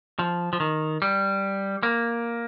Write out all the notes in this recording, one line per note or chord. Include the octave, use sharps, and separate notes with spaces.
F3
F3
D#3
G3
A#3